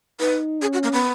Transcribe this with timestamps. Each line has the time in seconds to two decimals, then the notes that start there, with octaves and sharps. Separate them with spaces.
0.20 D#4 B4
0.62 C#4 G#4
0.73 F#4
0.83 A#3
0.93 B3